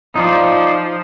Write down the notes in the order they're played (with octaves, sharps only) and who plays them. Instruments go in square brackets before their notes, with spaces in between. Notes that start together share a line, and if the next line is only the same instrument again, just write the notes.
[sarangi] F3 [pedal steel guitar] D#4 F4 D5